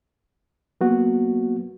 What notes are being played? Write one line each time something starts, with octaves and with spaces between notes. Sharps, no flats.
F#3 A#3 B3 F#4